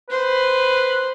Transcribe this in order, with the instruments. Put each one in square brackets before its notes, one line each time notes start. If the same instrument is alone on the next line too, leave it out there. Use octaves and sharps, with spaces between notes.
[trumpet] B4 [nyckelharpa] C5